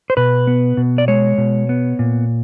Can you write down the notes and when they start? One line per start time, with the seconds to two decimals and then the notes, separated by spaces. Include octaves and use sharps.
0.10 C5
0.17 B2 B4
0.47 B3
0.77 B2
0.98 D5
1.08 G#3 C#5
1.38 B2
1.69 B3
1.99 A#2